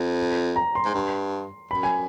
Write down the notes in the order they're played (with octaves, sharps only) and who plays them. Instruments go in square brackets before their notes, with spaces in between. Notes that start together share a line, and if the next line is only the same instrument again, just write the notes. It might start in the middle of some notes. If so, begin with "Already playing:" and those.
Already playing: [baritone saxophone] F2
[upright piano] A#5
C6
[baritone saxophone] G#2
G2
[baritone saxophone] F#2 [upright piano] B5
[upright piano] G#5